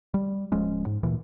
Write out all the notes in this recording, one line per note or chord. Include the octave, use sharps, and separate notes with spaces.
G3
D1 F3 G#3 C#4
G#2
D2 A#2 E3